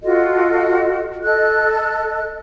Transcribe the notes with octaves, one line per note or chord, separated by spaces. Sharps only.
F4 F#4 A4 D#5
A4 D#5 F#6